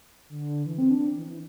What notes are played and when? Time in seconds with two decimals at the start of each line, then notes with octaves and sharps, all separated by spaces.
0.29 D3
0.66 E3
0.78 C4
0.91 D4
1.15 E3
1.27 E3